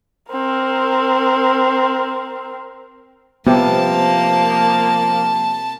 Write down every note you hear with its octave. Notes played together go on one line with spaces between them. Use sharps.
C4 A#4
C3 F3 G3 A#3 B3 A5